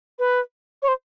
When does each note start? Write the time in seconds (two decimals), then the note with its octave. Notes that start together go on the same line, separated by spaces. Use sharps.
0.19 B4
0.82 C#5
0.88 C5